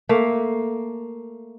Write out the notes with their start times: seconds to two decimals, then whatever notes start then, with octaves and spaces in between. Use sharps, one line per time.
0.09 A3 A#3